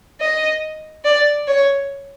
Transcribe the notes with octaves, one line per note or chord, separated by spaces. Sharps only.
D#5
D5
C#5